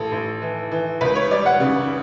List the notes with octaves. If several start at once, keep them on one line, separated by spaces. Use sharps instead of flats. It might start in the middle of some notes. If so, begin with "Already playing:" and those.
Already playing: A1 A4
A1
E3
E3
C#2 B4
C#5
G3 D5
F#5
C#3